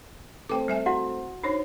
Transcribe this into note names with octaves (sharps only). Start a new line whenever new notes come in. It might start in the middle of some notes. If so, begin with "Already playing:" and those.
A3 C4 C5 G5 D6
G3 E5 G#5
E4 F#4 F#5
D4 D#4 C5 C#5